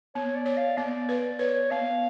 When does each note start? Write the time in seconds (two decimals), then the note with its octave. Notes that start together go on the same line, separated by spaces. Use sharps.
0.15 B3 C#5
0.35 D5
0.46 C#5
0.57 F5
0.77 B3 D5
1.09 B4
1.39 B4 C#5
1.71 B3 F5